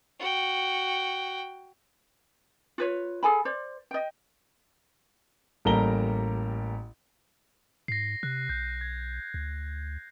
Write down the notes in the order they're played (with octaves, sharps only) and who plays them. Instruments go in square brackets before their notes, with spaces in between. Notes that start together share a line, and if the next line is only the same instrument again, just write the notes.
[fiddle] F#4 G5
[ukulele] F4 B4 C#5
G#4 A4 G#5 B5
C5 D5
D#5 G5
[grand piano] A1 G3 A#3 A4 A#5 G7
[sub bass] G#2 [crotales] A#6 C7
[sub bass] C3 [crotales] F#6
[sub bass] B1 [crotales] G6
[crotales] G#6
[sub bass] D2